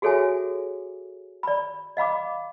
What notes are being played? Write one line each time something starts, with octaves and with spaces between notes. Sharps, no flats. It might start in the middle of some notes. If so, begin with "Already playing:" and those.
F#4 G#4 A4 C#5 E5 G#5
D5 B5
D#5 F5 B5 D6